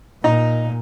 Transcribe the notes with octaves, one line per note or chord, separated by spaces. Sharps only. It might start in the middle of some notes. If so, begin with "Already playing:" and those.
A#2 D#4 A#5